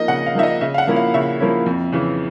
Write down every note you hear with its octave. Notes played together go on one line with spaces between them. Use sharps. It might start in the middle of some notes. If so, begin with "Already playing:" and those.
Already playing: F3 A#3 D#4 D#5
C#3 F#5
F5
F3 A#3 D#4 E5
D#5
C#3 E5
F5
F#5
F3 A#3 C#4 E4
F5
C#3 E5
F3 A#3 C#4 E4
F2
C#3 E3